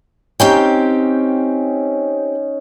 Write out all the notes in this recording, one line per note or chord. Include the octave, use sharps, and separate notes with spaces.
C4 C#4 D#4 G4 G5